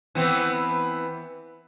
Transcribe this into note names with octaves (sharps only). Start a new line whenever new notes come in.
E3 B3 C4